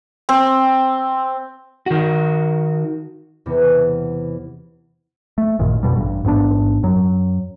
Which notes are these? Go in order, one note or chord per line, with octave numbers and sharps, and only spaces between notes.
C4
D#3 F#4
E2 C3 B3
A3
A1 F#2 A#2 D#3
A#1 F2 B2 G3
A1 G2
A1 G#2 B3 D4
F#2 F#3